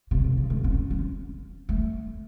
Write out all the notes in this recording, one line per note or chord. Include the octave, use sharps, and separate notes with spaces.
C3
C#3
C#3
A3
C#4
C#4
A3